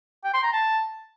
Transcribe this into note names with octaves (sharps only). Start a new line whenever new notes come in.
G5
C6
A#5
A5